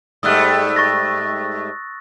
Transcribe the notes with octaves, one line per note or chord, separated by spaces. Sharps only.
G#2 G3 A3 D#6 E6 F#6
C#6 A6 A#6